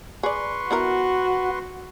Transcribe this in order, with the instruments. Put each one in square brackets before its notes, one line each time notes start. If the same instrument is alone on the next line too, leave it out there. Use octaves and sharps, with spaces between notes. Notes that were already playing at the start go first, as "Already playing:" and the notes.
[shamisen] G#4 D5 [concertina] B4 C6 C#6
[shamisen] B3 E4 A#4 [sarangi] F#4